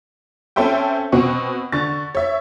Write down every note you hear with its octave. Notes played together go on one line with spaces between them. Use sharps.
C4 C#4 A4 C5 E5 G5
B2 C4 F#4 C#6
D3 C#6 A6
C#5 E5